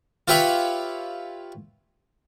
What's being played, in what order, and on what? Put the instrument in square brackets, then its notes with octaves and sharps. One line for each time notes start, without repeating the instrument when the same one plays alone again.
[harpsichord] F4 G4 B4 C#5 E5 B5